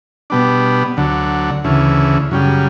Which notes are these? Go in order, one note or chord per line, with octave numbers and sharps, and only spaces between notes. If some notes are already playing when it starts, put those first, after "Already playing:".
B2 G3 B3 D4
D2 D3 F#3
D2 C#3 E3
F#2 C#3 G3